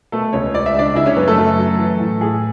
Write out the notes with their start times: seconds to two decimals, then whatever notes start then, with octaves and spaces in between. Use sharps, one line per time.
0.12 B2 A3 A4
0.33 C#2 C#4 C#5
0.54 C#2 D5
0.66 E5
0.74 G#3 D4 D5
0.95 C#3 E4 E5
1.06 C#4 C#5
1.16 F#2 B3 B4
1.28 A3 A4
1.38 F#2
1.58 F#3
1.78 E3
2.00 A2
2.21 A2 G#4